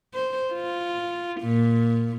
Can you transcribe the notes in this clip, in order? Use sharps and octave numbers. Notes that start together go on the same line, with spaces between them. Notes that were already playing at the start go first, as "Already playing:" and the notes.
C5
F4
A#2